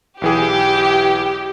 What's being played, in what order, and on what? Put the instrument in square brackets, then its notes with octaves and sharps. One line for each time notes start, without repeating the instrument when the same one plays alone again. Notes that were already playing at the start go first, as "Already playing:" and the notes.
[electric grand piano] B1 E3 G#4 [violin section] G4